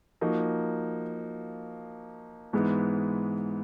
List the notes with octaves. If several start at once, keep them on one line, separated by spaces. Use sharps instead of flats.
F3 A#3 D#4 F#4
G#2 E3 G#3 B3